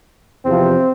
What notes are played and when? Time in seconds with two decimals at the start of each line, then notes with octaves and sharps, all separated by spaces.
0.45 E2 C3 F3 C4